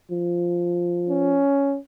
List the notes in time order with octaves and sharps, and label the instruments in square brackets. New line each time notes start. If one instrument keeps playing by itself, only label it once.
[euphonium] F3
[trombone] C#4